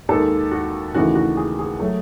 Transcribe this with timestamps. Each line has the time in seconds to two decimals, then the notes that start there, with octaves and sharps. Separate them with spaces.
0.09 D#2 D#3 G#3 A4
0.51 F#4
0.94 D#2 C#3 E3 A3 F#4
1.15 F#4
1.37 G#4
1.58 G#4
1.80 F#3 A3